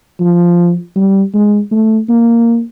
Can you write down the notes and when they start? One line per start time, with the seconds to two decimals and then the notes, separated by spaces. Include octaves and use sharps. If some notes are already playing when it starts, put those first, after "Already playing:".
0.20 F3
0.96 G3
1.34 G#3
1.72 A3
2.09 A#3